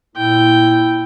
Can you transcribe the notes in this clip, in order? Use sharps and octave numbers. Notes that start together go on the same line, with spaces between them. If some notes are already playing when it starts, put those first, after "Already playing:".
A#2 E4 G5